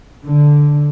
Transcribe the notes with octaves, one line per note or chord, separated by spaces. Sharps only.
D3